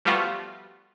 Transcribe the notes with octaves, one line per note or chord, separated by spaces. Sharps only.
F3 G3 A3 B3 F4 F#4